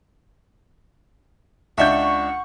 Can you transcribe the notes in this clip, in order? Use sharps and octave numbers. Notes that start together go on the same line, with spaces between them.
C#2 D4 E5 F#5 C#6 G6